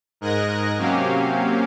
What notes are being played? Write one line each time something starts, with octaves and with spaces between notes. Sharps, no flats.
G#2 A#4 D#5 F#6 G#6 A#6
C3 F#3 A#3 C#4 G4 F5